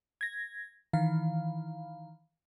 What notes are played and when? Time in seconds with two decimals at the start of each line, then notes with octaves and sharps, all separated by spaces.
0.21 G#6 A#6
0.93 D#3 E3 F5